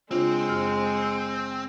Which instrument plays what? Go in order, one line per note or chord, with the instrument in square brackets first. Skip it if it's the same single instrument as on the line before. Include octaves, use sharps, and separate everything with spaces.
[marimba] C#3 D4 F4 [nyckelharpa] G#3 [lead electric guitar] C4
[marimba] F#2 F6